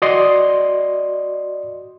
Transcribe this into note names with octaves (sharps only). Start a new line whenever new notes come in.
F#4 D5 D#5 C6